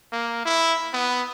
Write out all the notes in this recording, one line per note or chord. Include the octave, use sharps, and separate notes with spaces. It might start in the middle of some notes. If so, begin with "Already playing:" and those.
A#3
E4
B3